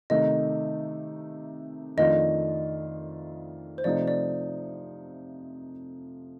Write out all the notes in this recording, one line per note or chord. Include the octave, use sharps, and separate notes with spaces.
C3 D#3 A3 D#4 D#5
F2 D#3 A3 D4 F4 D#5
C5
C3 F3 A3 D#4 D5
D5